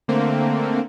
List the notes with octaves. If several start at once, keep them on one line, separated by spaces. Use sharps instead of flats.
D3 A3 A#3 C4